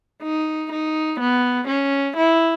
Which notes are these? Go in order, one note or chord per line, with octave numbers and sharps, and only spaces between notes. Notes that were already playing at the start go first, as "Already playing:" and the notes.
D#4
D#4
B3
C#4
E4